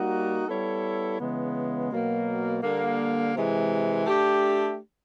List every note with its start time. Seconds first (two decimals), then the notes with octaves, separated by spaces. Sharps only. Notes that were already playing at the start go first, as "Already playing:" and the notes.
Already playing: G3 A#3 D#4 F#4
0.47 G3 B3 E4 A4 C#5
1.19 C#3 E3 G#3 B3
1.91 B2 F#3 A#3
2.62 D3 G3 A#3
3.33 C3 E3 G#3
4.05 A3 D4 G4